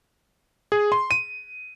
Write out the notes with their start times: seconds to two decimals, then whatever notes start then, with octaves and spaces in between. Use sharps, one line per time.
0.72 G#4
0.92 C6
1.11 D#7